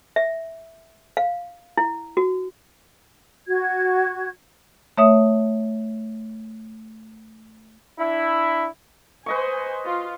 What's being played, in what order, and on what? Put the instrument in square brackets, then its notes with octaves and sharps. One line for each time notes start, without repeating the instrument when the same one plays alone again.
[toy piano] E5
F5
E4
F#4
[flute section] F#4 G#6
[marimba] A3 C#5 E5 D#6
[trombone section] D4 E4
[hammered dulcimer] B4 D#5 C#6 [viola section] C5 G#5
[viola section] F4